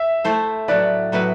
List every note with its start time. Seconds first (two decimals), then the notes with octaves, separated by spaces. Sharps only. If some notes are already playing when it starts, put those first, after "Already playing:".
Already playing: E5
0.24 A3 E4 A4 C5
0.68 A2 F#3 B3 E4 B4 D5
1.12 A2 F#3 B3 E4 B4